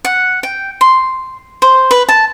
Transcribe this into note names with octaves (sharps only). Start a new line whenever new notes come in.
F#5
G5
C6
C5
B4
A5